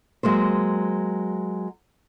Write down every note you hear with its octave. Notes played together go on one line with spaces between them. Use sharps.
F#3 G#3 A#3 C5